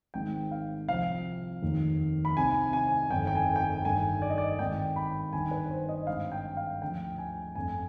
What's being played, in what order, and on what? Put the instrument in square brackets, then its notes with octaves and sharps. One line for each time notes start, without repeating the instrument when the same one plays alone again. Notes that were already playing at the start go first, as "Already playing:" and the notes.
[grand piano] G#1 G#2 D#3 G5
F5
C2 C3 F3 F5
F1 D#2 D#3
B5
C2 C3 D#3 G#5
G#5
G1 F2 D#3 G5
G5
G#5
G5
G#5
G1 G2 D#3 G#5
D5
D#5
D5
G#1 G2 D#3 G5
B5
G1 G2 D#3 G#5
B4
C5
D#5
G#1 G2 D3 F5
G5
F5
D2 D3 F3 G5
G#5
G1 F2 D3 G#5